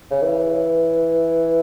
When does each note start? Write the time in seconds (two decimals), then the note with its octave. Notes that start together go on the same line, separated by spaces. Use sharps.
0.11 C#3
0.22 E3